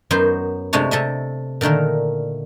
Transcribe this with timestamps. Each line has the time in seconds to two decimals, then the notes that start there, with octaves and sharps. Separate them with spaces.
0.11 F#2 F#3 B3 D#4 C5 C6
0.73 C3 G#3 A3 D4 C#5
0.91 C3 A4 D#5 E5
1.61 A#2 D3 D#3 A3 A#4